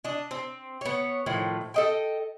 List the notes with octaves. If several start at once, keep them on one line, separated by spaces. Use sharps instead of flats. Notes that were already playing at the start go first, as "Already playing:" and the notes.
D4 D#5
C4
B3 C#5
A2 D#3 F3
A4 D#5 G5